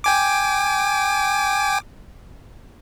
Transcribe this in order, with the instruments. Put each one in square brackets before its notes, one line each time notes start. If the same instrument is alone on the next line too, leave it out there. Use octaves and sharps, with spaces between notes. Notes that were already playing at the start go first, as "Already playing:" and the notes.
[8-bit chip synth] G5 G#5 D6